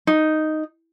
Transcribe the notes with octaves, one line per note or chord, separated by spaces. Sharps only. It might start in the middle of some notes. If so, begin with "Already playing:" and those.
D#4